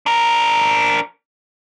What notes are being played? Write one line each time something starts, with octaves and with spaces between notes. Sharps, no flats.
D4 A#4